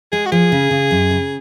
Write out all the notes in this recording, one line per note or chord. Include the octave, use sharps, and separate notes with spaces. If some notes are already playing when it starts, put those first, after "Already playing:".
G#3 G#4
F#4
F3 G#4
C#3
C#3
F#2
C#3